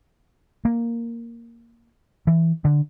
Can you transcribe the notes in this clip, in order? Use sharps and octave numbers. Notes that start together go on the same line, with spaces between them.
A#3
E3
D3